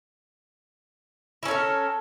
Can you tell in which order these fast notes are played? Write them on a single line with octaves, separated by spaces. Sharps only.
E4 C#4 A4 A#4